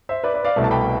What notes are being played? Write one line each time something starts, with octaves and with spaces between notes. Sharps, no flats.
C5 E5
B4 D5
B4 D5
D5 F5
C2 B2 A3
A5
G5 B5